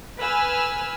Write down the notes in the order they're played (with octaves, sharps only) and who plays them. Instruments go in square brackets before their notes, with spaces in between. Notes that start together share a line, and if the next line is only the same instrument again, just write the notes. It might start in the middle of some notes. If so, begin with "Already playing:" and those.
[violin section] B4 G#5 E6 F6